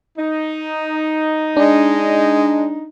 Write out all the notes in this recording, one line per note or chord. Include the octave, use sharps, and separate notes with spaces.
D#4
G#3 D4